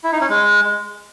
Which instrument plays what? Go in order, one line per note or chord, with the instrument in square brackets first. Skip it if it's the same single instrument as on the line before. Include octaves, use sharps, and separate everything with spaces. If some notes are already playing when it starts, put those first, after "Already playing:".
[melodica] E4
D#4
C#4
G#3